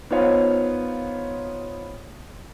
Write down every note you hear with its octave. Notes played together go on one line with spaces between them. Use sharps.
B3 D#4 F4 C5 C#5 F5